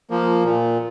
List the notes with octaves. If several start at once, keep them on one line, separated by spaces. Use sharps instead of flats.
F3 A#3
A#2